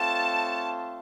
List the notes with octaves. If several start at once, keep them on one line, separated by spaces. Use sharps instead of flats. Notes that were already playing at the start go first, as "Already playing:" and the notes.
Already playing: A3 C4 F4 A4 C#5 A5